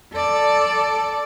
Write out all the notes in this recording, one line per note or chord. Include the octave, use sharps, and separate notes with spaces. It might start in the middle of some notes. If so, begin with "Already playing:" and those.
A4 D5